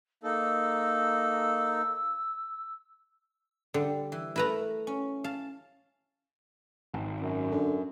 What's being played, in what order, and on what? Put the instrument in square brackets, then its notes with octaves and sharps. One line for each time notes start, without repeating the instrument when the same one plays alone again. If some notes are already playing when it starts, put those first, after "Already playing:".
[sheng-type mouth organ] A#3 D#4 A4 [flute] E6
[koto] D3 [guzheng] G3
[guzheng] E3
[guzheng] A3 A#4 [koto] E4 B4 A#5
[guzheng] C#4
[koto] F5 [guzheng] A5
[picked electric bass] G#1
[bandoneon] F#2
[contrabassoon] D3